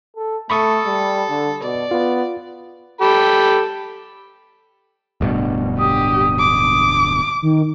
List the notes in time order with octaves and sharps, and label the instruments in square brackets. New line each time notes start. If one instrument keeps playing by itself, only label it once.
[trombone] A4
[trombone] A3 [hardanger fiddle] A4 [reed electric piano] B5 C#6 D#6
[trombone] G3
D3
[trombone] B2 [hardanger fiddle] D5
[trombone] B3 [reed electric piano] F4
[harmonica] G4 A4 B5
[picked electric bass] D1 G2 B2
[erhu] G4 [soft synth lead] D#6
[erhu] D6
[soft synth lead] D#3